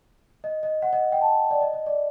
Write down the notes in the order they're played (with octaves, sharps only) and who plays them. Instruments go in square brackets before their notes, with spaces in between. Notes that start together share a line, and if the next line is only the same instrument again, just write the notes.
[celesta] D#5
D#5
F#5
D#5
G5
A5
D5
D#5
D#5
D5